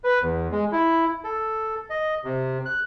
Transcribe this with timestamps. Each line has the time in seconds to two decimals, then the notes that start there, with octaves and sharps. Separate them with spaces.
0.04 B4
0.22 E2
0.52 G#3
0.72 E4
1.24 A4
1.90 D#5
2.24 C3
2.66 F#6